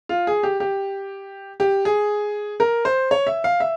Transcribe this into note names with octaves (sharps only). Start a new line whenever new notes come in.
F4
G#4
G4
G4
G4
G#4
A#4
C5
C#5
E5
F5
E5